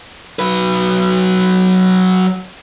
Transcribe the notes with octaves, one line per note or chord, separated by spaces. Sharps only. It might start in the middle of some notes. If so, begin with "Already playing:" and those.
F#3 B4